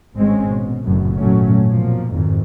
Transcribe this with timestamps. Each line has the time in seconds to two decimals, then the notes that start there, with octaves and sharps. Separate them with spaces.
0.17 G#1 A2 G#3 C4 C#4
0.48 B2
0.83 F#1 F#2 A2
1.18 G#1 A#2 F#3 A3 C#4
1.70 B2 F3 A#3
2.13 G#1 F2 G#2 D#3